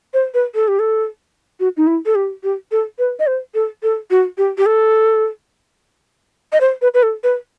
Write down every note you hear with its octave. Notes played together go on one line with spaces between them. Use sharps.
C5
B4
A4
G4
A4
F#4
D#4
E4
A4
G4
G4
A4
B4
D#5
C5
A4
A4
F#4
G4
G4
A4
D#5
C5
B4
B4
A4
B4